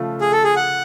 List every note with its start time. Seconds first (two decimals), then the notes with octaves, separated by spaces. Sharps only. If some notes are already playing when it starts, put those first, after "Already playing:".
Already playing: C#3 F3 A3 F4
0.21 G#4
0.32 A4
0.44 G#4
0.56 F#5